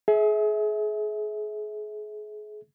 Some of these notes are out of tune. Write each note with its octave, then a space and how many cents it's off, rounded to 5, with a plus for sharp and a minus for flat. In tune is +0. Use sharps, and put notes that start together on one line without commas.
G#4 +30 E5 -25